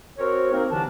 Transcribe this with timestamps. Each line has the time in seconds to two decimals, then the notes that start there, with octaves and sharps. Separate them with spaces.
0.18 C4 F#4 A#4 C#5
0.52 A#3 C4 D#4 A#4
0.71 C2 D3 E3 D4 A5